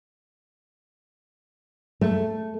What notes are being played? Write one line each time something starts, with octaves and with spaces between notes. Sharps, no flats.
A3